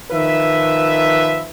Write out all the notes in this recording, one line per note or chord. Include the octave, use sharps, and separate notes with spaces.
D#3 F3 B4 E5